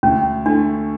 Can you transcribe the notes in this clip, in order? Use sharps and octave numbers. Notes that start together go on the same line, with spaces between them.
D2 C#4
A3 D4